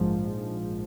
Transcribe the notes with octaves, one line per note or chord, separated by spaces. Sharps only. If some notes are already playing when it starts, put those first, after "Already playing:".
Already playing: A#1 G#2 F3